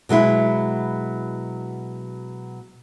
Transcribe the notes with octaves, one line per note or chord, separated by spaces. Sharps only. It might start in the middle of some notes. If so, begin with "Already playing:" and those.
B2 F#3 G#3 E4